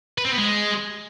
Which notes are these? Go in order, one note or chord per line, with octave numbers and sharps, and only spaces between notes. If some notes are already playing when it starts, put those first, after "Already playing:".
B4
C4
B3
G#3